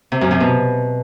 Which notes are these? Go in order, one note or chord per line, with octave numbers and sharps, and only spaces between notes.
C3
F#2
C3
B2